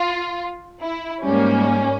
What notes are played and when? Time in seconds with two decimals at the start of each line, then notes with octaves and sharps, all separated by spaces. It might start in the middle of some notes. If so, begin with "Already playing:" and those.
Already playing: F4
0.81 E4
1.24 G#2 G3 A#3 C#4